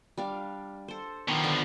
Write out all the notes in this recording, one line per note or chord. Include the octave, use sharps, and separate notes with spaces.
G3 D4 F5
A4 C5
B2 D#3 F3
D3 B4 D5